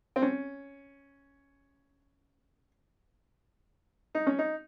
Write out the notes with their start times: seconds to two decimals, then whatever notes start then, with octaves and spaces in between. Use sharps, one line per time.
0.16 C4
0.22 C#4
4.15 D#4
4.27 C#4
4.39 D#4